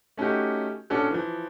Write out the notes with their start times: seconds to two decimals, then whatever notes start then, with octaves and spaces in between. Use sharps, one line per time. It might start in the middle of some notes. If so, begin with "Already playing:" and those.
0.17 A3 C#4 D#4 F#4 G4
0.90 A#2 C#4 D4 F#4 A4
1.10 E3 F3